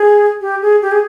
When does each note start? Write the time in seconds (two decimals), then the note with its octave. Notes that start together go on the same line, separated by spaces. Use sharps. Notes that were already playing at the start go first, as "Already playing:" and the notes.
Already playing: G#4
0.41 G4
0.62 G#4
0.82 G4
0.91 G#4